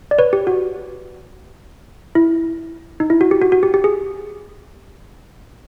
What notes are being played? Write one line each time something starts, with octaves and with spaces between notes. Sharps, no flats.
D5
B4 C#5
G4
F#4
E4
D#4
E4
F#4
G4
F#4
F#4
G4
G4
G#4